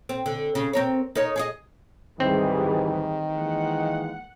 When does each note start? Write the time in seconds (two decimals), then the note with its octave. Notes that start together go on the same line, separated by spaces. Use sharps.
0.09 C4
0.26 D3
0.55 C#3
0.73 C4 A#4 C#5
1.15 D#4 A#4 C#5
1.36 G#4 C#5 D#5
2.20 D2 G#2 D#3 E3 G3 C4 G#4
3.37 E3 G#3 A#3 F#5